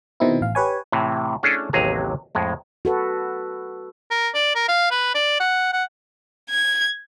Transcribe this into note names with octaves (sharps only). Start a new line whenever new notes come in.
B2 D#3 C4 D#4 E4
A1 F5
G4 B4 C#5 G#5
A2 C3 E3
A3 C#4 D4 E4 G#4 A4
A1 D#2 C3 F#3 G#4 A#5
F2 A2 G#3
F#4 A4 B4
A#4
D5
A#4
F5
B4
D5
F#5
F#5
G#6